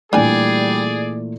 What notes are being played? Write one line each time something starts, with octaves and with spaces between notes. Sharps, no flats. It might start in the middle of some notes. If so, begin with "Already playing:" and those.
A#2 E3 G3 A3 D4 G#4 D5 G#5